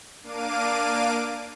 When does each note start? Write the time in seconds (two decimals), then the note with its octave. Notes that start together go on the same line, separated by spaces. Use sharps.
0.23 A#3 D4 F5 D6 D#7